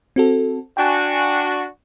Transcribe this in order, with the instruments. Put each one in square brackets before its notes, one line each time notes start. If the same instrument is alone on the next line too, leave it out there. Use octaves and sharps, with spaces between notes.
[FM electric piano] C4 F#4 A4
[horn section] D4 F#4 [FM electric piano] G5 G#5